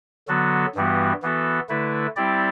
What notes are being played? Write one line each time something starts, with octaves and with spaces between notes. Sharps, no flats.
D3 F#3 B3 F#4 A4
G2 E3 G3 B3 F#4
E3 B3 F#4 A4
D3 A3 E4 B4
G3 C4 E4 G4 D5